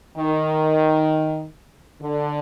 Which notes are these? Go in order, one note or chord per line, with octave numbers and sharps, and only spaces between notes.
D#3
D3